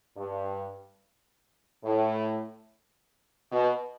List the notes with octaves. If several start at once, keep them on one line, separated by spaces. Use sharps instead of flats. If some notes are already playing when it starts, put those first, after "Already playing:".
G2
A2
B2